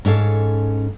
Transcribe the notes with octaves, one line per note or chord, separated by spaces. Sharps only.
G#2 C#4 A4 F5